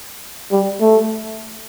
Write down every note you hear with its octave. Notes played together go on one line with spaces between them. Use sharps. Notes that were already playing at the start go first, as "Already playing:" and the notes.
G3
A3